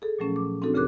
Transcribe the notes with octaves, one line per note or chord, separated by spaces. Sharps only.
G#4 A4
A#2 F3 F#3 A3 C#4
D6
C4 D4 D#4 F#4 A4
D2 C#3 G#4 A#4 D6 F#6